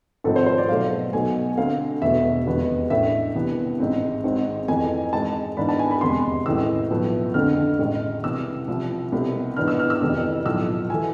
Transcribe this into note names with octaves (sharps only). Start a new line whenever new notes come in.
G#1 G#2 F3 A3 C4 A4
C5
C5
D5
B1 B2 A3 F5
B1 B2 A3 G#5
D2 D3 A3 C4 F5
E1 E2 B2 A3 E5
F1 E2 B2 G#3 B3
A1 A2 G#3 D4 E5
C2 C3 E3 B3
A1 G#2 G#3 C4
G#1 G#2 G#3 C4
F2 E3 A3 G#5
G#2 G#3 C4 A5
G#2 E3 B3 D4 B5
A5
G#5
B5
F1 E2 C3 G#3 C6
A1 A2 E3 G#3 C4 E6
B1 A2 F3 B3
F2 D3 A3 C4 F6
A1 A2 G#3
C2 C3 E3 E6
C2 C3 F3
C2 B2 A3 C4
G#2 E3 B3 D4 F6
E6
F6
E6
F1 F2 E3
B1 A2 F3 E6
E3 A3 G#5